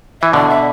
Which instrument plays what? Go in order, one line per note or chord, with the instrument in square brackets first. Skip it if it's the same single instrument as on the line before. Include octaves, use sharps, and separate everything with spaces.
[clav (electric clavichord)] E3 [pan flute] E5
[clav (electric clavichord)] B2 D3 [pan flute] D5
[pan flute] E5